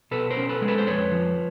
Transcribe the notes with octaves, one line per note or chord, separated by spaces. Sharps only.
B2 A4 B4
A#4 C5
C#4
A4 B4
G#3
A4 B4
C5
F2 B4 C#5
F3